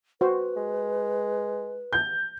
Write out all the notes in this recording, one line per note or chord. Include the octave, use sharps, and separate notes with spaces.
F#4 B4 C5
G#3
G6